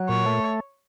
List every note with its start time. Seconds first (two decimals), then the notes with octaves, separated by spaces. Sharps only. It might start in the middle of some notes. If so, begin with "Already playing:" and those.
Already playing: F#3
0.09 A#2 C#5
0.26 A3